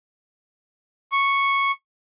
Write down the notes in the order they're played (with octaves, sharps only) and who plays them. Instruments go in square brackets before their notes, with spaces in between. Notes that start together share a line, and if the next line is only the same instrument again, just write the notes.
[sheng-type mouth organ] C#6